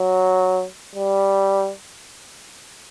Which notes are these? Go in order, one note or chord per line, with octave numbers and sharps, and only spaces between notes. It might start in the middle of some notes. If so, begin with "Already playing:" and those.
Already playing: F#3
G3